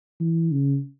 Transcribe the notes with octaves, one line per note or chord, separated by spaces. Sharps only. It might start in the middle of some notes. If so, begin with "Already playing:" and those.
E3
C#3